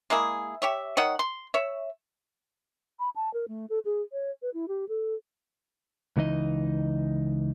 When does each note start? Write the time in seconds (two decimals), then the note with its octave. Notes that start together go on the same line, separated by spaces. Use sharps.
0.10 G#3 A#3 E4 G#4
0.62 G4 C#5 E5
0.97 D#3 C#5 D#5 F#5
1.19 C6
1.54 C#5 E5
2.99 B5
3.16 A5
3.34 A#4
3.48 A3
3.70 A4
3.85 G#4
4.12 C#5
4.42 B4
4.54 E4
4.68 G4
4.89 A4
6.17 C#2 E3 D#4 D#5